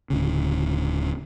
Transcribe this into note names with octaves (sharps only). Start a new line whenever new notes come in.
D1 G#1 D2 C#3